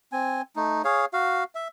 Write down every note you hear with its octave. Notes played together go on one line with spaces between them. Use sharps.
C4 G#5
A3 D#4
G#4 C#5 F5
F#4 F5
E5